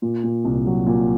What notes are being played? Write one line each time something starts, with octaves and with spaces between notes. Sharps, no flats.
A#2
A#2
C2
F#3
A#2